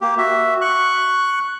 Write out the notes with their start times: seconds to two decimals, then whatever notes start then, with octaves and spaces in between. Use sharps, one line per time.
0.01 A#3 G4
0.18 F#4 E5
0.61 C#6 F#6